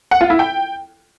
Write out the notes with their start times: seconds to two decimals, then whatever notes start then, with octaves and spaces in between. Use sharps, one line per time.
0.11 F#5
0.21 F4
0.30 E4
0.39 G5